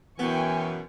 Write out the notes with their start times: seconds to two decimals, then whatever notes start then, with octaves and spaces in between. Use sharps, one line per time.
0.19 F#2 B2 E3 B3 G5 G#5 C#6